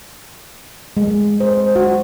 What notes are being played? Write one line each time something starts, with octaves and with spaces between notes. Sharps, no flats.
G#3
C5
F#4